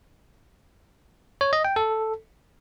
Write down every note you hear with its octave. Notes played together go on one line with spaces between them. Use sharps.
C#5
D#5
G5
A4